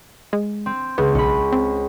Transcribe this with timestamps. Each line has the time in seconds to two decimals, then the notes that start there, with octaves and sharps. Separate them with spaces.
0.33 G#3
0.66 C4
0.98 C#2 B3
1.15 B1 C#4 B5
1.53 C4